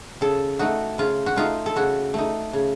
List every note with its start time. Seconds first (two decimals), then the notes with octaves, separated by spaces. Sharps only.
0.21 C#3 A4
0.59 A3 D#4 F#4
0.98 C#3 F4
1.26 F#4
1.36 A3 D#4 F4
1.66 A4
1.76 C#3 F#4
2.14 A3 D#4
2.53 C#3